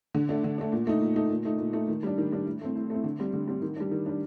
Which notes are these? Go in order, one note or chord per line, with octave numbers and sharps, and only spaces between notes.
D3
A3 D4
D3
A3 D4
A#2
A3 D#4
A#2
A3 D#4
A#2
A3 D#4
A#2
A3 D#4
D#3
G3 D4
D#3
G3 D4
A2
A3 C4
A2
A3 C4
D3
G3 C4
D3
G3 C4
D#3
G3 D4
D#3
G3 D4